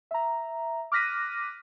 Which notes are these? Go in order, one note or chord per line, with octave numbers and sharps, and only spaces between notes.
E5 A#5
D6 F6 F#6 A#6 B6 D#7